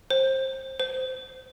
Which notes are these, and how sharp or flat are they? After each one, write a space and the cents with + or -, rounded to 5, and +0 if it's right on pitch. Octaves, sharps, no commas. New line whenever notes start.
C5 +25
C5 -15